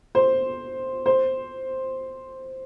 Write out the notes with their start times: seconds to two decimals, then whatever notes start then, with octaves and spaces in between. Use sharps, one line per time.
0.15 C5
1.06 C5